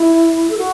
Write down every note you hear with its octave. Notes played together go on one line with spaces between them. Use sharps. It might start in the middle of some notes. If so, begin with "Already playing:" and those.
Already playing: E4
A4
F#4